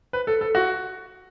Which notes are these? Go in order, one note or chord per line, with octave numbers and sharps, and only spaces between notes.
B4
A4
A4
F#4